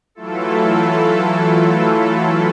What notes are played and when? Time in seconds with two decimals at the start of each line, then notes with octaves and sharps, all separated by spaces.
0.15 E3 F#3 A3 E4 F4 A4